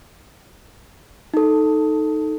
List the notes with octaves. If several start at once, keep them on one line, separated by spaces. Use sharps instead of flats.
D#4 A4